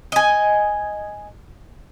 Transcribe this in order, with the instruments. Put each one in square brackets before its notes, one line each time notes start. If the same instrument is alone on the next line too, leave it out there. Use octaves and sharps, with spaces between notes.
[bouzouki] D#5 G#5